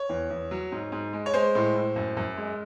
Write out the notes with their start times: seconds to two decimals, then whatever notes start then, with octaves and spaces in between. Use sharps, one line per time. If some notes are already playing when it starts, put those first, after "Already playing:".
Already playing: C#5
0.09 E2
0.30 E2
0.51 F#3
0.72 G#2
0.92 G#2
1.13 G#3
1.26 C#5
1.34 G#3 C5
1.55 A2
1.75 A2
1.96 F#2
2.17 F#2
2.37 G#3